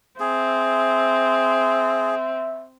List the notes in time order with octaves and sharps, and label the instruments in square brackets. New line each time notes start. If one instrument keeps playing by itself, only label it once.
[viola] C4 [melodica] G#4 [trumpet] E5